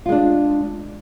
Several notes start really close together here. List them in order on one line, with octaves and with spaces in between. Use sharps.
F4 G#3 D4